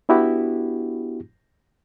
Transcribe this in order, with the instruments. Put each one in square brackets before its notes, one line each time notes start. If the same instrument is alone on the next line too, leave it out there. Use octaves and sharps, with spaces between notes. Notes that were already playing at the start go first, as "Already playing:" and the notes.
[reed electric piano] B3 D4 E4 F#4 G4